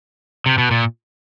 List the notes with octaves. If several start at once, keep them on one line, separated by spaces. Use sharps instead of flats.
C3
B2
A#2